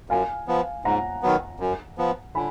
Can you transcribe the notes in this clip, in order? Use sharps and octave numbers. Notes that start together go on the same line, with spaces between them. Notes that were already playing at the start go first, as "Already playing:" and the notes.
F#2 F5 G#5
F3 B3
G#2 F#5 A#5
D#3 F#3 B3
F#2
F3 B3
D3 G#5 B5